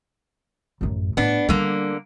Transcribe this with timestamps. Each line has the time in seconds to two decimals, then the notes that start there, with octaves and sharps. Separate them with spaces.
0.81 A1 F#2
1.17 A2 B3 D4
1.49 D3 G3 A#3 D4